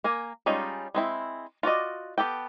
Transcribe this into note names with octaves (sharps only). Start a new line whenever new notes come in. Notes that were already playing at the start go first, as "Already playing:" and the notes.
A#3 A#4 G#5
G3 G#3 C#4 D#4 F4
G#3 C4 E4
F4 F#4 D5 D#5
B3 G4 A4 G5